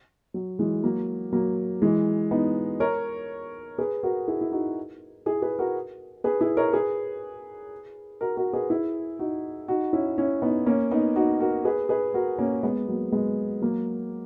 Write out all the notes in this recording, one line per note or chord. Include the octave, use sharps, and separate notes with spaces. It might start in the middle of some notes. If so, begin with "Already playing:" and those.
F#3
E3 G#3
F#3 A#3
F#3 A#3
E3 G#3
B3 D#4
A#4 C#5
G#4 B4
F#4 A#4
E4 G#4
E4
D#4 F#4
E4 G#4
G#4 B4
F#4 A#4
G#4 B4
E4 G#4
A#4 C#5
G#4 B4
F#4 A#4
F#4 A#4
G#4 B4
E4 G#4
D#4 F#4
D#4 F#4
C#4 E4
C#4 E4
B3 D#4
A#3 C#4
B3 D#4
D#4 F#4
F#4 A#4
G#4 B4
G#4 B4
F#4 A#4
A#3 C#4
G#3 B3
F#3 A#3
G#3 B3
F#3 A#3